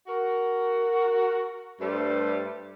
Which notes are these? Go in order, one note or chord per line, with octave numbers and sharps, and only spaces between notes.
F#4 A#4
G2 G3 A3 C5